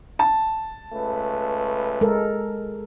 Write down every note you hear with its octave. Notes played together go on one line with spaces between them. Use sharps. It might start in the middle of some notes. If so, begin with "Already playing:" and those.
A5
C#2 A3 B4
G#3 A4 A#4